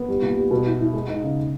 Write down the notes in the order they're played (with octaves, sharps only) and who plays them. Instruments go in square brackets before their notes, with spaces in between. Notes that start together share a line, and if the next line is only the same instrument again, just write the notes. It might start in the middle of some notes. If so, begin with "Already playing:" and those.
Already playing: [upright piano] B3
G3
A#2
G3
B2
E4
E4
G#3
D#4
C#3